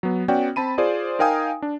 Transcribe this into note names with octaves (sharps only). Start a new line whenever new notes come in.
F#3 B3
B3 C#4 F#4 D5 G5
C4 A5 B5 D#7
F4 G#4 C5 D5
D#4 A#4 F5 G5 G#5 D#6
D4